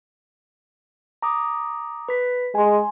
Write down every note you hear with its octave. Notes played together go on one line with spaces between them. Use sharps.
A#5 D6 D#6
B4 B6
G#3 G#5 C6